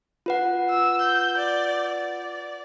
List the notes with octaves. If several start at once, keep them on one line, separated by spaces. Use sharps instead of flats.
F4 B4 F#5
E6
G6
D5
D5